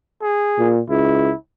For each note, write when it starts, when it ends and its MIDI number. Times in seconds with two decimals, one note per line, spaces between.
0.21 0.74 68
0.59 0.80 46
0.89 1.30 37
0.89 1.37 64